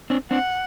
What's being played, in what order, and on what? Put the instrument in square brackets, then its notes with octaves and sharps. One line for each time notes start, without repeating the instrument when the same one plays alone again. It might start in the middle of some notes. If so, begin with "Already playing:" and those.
[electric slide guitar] C4 D4
[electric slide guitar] C4 D4 [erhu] F#5